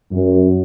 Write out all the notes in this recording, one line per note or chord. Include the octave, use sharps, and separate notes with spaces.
F#2